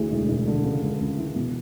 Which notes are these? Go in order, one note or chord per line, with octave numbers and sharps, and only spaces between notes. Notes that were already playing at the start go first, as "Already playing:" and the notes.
Already playing: D2 E3 G#4
E1
E1
D3
C#3
C#2
C#2
E3
B2